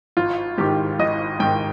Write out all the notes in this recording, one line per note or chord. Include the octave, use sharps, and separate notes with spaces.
G#1 F4
G#2 D#3 G4
G#1 D#5
G#2 D#3 G5